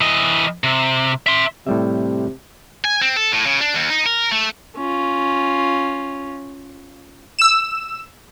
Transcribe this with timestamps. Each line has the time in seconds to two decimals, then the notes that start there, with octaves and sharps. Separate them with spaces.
0.01 E3 D#5
0.64 C3
1.27 E5 C6
1.67 A2 C3 G3 E5
2.85 G#5
3.02 C4
3.16 A4
3.32 A2
3.46 C#3
3.61 D4
3.74 D#2
3.90 D#4
4.06 A#4
4.32 A3
4.76 C#4 F4
7.39 E6 E7